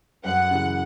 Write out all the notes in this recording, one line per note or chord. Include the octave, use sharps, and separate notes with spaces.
F#2 F#5
C#3 E3